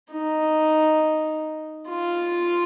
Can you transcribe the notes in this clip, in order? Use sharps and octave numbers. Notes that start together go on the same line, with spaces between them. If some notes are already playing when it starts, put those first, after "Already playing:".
D#4
F4